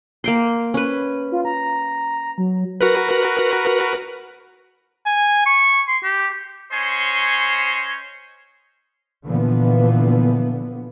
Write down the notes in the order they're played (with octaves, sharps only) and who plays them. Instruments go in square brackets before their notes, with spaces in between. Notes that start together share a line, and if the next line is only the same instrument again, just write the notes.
[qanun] A#3 G5 C6
C#4 B4
[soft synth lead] F4
A#5
F#3
[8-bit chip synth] F#4 A#4 B4
[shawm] G#5
C#6
C6
G4
[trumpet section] C#4 C5 C#5 D#5 G#5 C6
[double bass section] A#2 D3 E3 F3 B3